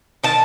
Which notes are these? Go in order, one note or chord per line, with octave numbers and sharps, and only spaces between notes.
D#3 A5